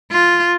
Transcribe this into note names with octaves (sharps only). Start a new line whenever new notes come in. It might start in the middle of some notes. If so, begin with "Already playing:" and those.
F4